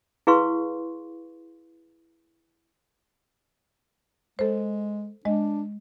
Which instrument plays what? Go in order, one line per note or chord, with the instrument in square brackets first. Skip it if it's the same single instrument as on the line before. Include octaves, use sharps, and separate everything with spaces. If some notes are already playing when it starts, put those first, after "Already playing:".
[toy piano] E4 G#4 B4 F5 C6 C#6
[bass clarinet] G#3 [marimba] A4 C5
[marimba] G#3 D#5 [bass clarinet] D4